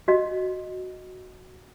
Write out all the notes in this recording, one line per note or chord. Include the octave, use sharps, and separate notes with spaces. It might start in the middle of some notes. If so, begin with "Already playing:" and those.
F#4 D#5